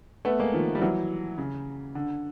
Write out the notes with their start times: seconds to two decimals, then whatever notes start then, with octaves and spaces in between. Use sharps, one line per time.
0.25 A3 B3
0.40 G#3 A#3
0.54 D#3 F3
0.75 G3
0.82 E3 F#3
1.38 C#3
1.95 D3